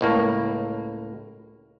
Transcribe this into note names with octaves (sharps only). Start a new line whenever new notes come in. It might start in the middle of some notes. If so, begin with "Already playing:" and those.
C#2 A2 A#3